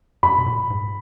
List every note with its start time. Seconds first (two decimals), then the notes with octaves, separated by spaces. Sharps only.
0.23 F#2 B5
0.38 B2
0.46 A#2
0.70 G#2